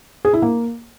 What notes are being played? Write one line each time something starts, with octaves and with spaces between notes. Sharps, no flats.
G#4
E4
A#3